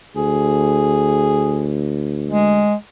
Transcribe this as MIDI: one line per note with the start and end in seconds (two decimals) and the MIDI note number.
0.16 2.70 38
0.16 1.76 68
2.29 2.74 56